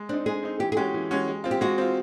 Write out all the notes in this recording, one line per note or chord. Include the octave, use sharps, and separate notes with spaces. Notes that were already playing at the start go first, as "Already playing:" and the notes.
Already playing: G#3
C4 D4 D#4
G#3 G#4
C4 D#4
E3 G4
G#4
G#3 C#4 F#4 G4
E3
G#3 C#4 F#4
G#3
C4 F4
G4
G#3 F#4
C4 F4